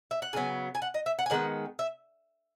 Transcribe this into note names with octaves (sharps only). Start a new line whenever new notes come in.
E5
F#5
C#3 F#3 B3 G#5
G#5
F#5
D#5
E5
F#5
G#5
D#3 G#3 B3 F#5
E5